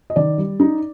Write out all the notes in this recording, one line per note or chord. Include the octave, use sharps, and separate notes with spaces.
D#5
D#3 D5
G3
D#4